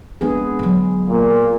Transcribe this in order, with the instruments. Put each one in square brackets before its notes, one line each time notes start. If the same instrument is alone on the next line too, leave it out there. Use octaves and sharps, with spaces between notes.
[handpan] G#3 B3 G#4 [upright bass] C4 D4
[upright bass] D3 F#3
[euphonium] A#2 [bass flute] A#3